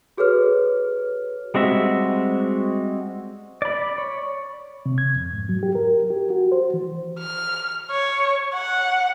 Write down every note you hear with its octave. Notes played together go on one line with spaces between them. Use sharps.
F#4 G#4 A4 B4 C#5 F6
G3 G#3 C4 F#4 E5
D5 B5
C#5
C3
G#6
F2
G#2
F#3
G4
A#4
G4
F#4
C5
E3
F6
C#5
F#5